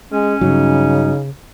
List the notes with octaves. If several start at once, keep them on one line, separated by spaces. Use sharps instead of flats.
G#3 C#4
G2 C#3 F#3 D#4